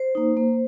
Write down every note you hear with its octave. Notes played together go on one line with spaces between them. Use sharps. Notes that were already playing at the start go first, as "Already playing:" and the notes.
Already playing: C5
A#3 D#4
A#3